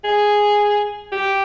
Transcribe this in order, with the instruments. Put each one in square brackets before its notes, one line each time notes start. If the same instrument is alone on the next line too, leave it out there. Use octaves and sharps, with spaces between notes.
[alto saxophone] G#4
G4